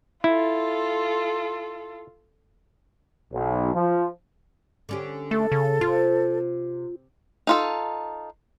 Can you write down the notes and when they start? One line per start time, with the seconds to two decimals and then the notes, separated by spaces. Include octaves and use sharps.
0.24 E4 F4 A4
3.33 B1
3.74 F3
4.89 D3 C#4 G4
5.31 A3 A4
5.52 C#3
5.81 C3 F4
7.47 D#4 F4 A4